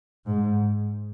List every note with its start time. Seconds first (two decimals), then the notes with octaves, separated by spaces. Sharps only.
0.26 G#2